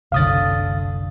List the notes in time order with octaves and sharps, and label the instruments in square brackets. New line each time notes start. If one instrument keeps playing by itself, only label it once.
[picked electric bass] F#1 C2 [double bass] D3 [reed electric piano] F5 D#6 A6